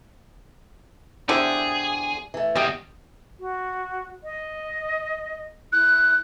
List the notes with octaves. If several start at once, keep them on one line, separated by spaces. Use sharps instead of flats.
E2 D3 E4 G4 G#4 C5 D5
E3 A3
E2 G3 G4 D#5
F#4
D#5
E4 F#6